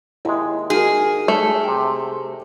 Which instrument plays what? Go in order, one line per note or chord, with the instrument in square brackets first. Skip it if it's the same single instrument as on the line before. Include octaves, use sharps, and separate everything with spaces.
[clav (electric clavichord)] D#2 G#3 [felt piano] E4
[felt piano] D#4 F#4 A#4 [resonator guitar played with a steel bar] G#4
[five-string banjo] A3
[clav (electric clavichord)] C3 G5